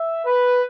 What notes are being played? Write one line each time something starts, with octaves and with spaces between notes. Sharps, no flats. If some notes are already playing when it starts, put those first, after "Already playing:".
Already playing: E5
B4